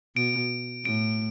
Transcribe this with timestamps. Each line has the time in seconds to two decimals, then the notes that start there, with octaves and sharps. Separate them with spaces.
0.16 B2 D7
0.84 A2 D7